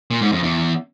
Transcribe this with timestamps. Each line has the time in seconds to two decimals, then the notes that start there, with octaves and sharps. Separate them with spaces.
0.11 A#2
0.21 G#2
0.32 F2
0.43 E2